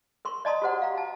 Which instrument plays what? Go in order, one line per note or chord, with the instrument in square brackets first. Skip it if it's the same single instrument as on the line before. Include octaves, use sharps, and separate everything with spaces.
[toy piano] A#4 C6 C#6
D5 D#5 A5 A#5 C6 D#6
F#4 G4 C5 F#5
F5 A#5
A5